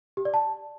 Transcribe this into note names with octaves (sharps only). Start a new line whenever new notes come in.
G4
D5
A5